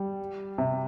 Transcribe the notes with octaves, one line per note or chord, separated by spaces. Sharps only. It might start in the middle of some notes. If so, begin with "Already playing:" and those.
Already playing: G3
C3